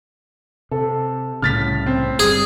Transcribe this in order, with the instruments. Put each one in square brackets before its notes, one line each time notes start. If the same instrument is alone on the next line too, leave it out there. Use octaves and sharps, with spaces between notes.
[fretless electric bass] C3 [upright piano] A4
[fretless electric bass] C2 A2 C#3 [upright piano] F6 A6 B6
[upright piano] C4
[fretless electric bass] G1 G3 [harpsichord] G#4